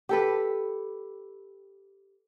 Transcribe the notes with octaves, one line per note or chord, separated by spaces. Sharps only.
G4 A4 B4